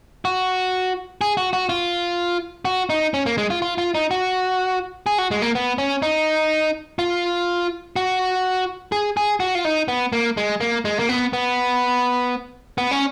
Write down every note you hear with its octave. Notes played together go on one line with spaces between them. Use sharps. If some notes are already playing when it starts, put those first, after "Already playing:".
F#4
G#4
F#4
F#4
F4
F#4
D#4
C#4
A#3
G#3
F4
F4
F4
D#4
F#4
G#4
F#4
G#3
A#3
B3
C#4
D#4
F4
F#4
G#4
G#4
F#4
F4
D#4
B3
A#3
G#3
A#3
G#3
A#3
B3
B3
B3
C#4